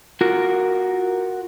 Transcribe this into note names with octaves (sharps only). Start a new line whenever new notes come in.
F4 F#4 A#4